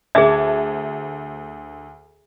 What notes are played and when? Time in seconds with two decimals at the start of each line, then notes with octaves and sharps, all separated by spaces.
0.15 D2 G#4 E5 A5 G#6